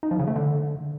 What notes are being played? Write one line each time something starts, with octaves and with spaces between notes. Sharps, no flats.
D#4
F3
C#3
A3
D3